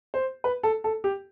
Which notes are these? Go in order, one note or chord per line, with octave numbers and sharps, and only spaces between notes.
C5
B4
A4
A4
G4